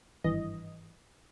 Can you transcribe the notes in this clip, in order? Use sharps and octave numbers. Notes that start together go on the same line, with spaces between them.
G#1 G2 E3 D#5